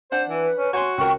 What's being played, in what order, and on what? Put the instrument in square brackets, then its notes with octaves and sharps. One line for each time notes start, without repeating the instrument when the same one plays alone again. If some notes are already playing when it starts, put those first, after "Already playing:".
[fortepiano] D4 F#5 [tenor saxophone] C5
[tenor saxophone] E3 [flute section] B4
[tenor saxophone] C#4
[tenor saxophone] F#4 [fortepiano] C#5 G#5 C6
[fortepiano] C#2 A#4 [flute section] G5 C#6